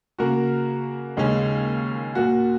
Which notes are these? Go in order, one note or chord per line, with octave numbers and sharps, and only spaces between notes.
C#3 A#3 F#4 A#4
D#2 C#3 G#3 C#4
A#2 A#3 F#4